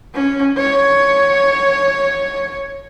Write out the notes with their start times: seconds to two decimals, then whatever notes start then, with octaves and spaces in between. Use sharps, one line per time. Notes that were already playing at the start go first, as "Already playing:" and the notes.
0.14 C#4
0.58 C#5